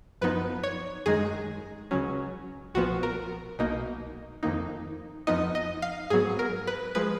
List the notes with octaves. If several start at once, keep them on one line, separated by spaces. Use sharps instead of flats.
F#2 F3 B3 D#4 B4
C#5
F#2 D#3 G#3 D#4 G#4
C#2 C#3 F#3 C#4
B1 A#2 F3 B3 F#4
A#4
B1 B2 A#3 D#4
F2 D#3 A#3 D#4
F2 F3 B3 D#4 D#5
D#5
F5
G#2 F#3 B3 G#4
A#4
B4
F3 G#3 B4